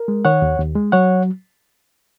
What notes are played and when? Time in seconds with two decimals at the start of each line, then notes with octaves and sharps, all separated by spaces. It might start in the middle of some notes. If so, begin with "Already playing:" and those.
Already playing: A#4
0.08 G#3
0.25 D#3 C#5 F#5
0.42 D#2
0.58 D#2
0.75 G#3
0.92 F#3 C#5 F#5